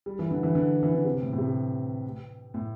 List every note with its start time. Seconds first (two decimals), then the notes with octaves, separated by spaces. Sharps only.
0.06 G3
0.19 E3
0.31 D3
0.43 E3
0.55 D3
0.83 E3
0.95 D3
1.05 C3
1.22 A2
1.33 A2
1.38 C3
2.54 A2